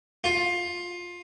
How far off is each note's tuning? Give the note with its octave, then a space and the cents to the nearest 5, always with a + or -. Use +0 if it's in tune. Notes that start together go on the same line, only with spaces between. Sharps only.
F4 +15